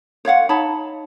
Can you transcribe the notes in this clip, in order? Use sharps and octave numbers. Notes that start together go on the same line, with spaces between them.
C5 C#5 F5 F#5
D#4 C#5 A5 B5